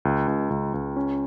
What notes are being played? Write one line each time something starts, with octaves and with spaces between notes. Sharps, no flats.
C#2
C#2
C#2
C#2
C#4